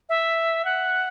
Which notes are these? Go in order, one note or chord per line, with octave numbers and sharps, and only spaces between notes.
E5
F#5